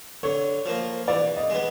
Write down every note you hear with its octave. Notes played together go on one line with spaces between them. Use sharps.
D3 C#5
F3 A#3
E3 D5
D#5
G#3 B3